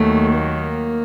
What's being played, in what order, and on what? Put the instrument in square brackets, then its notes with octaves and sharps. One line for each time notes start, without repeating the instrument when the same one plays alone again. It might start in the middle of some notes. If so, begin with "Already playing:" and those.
Already playing: [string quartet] D#2 D#3 F#3 [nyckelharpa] A3
[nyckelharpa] A#3